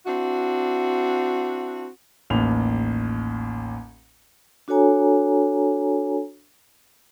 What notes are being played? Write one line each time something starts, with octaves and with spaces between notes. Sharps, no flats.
C4 D4 E4 F#4
A1 D#2 F7
D4 F#4 A4 C#5 G#5 A#5